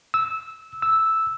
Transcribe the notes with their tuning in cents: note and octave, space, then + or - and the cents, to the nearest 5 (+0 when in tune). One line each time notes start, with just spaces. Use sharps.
E6 -15
E6 -5